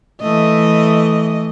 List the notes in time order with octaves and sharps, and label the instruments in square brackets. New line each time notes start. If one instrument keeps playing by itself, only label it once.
[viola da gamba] E3 A3 D#5